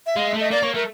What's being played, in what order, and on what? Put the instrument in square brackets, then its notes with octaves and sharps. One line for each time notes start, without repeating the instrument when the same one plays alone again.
[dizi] E5
[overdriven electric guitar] G#3 [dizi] F5
[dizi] E5
[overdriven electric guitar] A3
[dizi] D#5
[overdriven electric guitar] A#3 [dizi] D5
[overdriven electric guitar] A#3 [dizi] C#5
[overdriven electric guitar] A3 [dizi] A#4